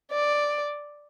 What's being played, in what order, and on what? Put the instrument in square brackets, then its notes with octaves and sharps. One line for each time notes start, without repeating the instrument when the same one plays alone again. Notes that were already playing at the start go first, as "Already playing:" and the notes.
[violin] D5